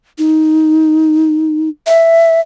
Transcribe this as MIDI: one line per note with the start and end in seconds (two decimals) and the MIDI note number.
0.18 1.69 63
1.87 2.40 76